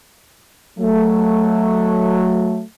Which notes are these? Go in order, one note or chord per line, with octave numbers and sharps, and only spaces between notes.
F#3 A3